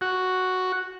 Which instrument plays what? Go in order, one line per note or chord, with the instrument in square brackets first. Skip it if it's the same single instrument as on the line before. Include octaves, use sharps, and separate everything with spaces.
[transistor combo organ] F#4